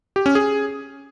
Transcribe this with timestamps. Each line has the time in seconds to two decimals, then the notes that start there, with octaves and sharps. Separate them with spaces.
0.16 G4
0.26 C#4
0.35 G#4